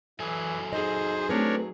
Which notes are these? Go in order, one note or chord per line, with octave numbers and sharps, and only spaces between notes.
E3 F#3 A4 G#5
D#4 G#4 C5 D#5
A3 C4 D4 A#4 B4 C#5